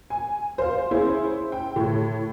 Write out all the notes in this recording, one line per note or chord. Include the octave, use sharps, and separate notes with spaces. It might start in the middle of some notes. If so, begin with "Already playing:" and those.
G#5
C5 F5
C#4 E4 G#4 C5
G5
A2